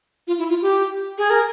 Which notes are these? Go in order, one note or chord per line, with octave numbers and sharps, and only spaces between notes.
F4
E4
F4
G4
G#4
A#4